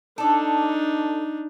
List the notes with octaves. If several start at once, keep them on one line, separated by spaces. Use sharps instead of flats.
D4 D#4 A4 D5